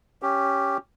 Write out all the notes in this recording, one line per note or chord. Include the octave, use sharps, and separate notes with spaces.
C#4 G4